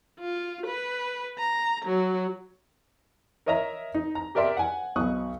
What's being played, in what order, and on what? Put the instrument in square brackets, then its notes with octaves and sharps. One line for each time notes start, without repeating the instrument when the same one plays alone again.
[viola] F4
B4
A#5
F#3
[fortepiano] A#4 C#5 D#5 E5 A#5
D#4
A#5
G4 A#4 D5 E5 C6
F#5 G#5
B1 B2 C#6 D#6 F#6